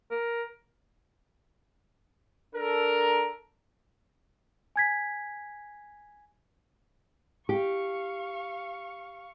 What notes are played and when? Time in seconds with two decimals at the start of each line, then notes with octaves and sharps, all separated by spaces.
0.11 A#4
2.54 D4 A4 A#4
4.76 G#5 G#6 B6
7.49 G4 F5 C#6